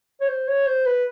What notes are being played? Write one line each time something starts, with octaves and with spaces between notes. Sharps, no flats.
C#5
C5
C#5
C5
B4